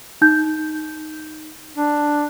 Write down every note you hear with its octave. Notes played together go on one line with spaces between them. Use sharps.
D#4 G6
D4